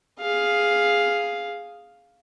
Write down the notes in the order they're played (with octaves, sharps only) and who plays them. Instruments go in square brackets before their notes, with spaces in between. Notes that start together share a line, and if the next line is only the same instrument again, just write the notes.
[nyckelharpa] G#4 F5